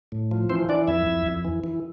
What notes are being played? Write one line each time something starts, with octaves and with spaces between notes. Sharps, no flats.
A2
F3
E3 C4 C5
E3 D4 D5
F2 E4 E5
F2
F2
E3
E3